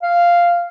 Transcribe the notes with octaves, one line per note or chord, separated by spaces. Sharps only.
F5